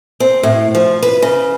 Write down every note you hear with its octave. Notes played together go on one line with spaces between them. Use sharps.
C4
A2
F3
B4
C#3